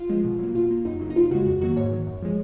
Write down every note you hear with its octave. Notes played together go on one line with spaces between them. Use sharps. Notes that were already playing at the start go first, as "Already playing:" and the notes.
Already playing: F4
F3 G#3
B2
F#3 A#3
B2 F4
A#3
F#2 D#4
C#3 F#3 A#3
D#4
F#2 F4
C#3 G#3 F#4
F2 F#4
D#3 F#3 A#3 F#4
G#2 C#5
D#3 F#3
F#2
F3 G#3